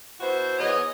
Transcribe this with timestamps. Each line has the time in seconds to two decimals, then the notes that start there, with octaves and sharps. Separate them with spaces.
0.20 B2 E4 F#4 C5
0.58 E3 B3 G#4 C#5 D#5